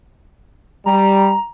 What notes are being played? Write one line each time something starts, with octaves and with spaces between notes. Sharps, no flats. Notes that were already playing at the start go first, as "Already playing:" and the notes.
G3 A#5